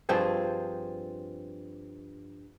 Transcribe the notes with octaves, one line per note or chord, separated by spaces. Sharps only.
G2 F3 C4 G#4